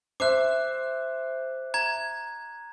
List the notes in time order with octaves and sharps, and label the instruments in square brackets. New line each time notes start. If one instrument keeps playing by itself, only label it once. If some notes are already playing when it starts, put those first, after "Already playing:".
[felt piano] C5 E5 [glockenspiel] D6 F#6
[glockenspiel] A#5 G#6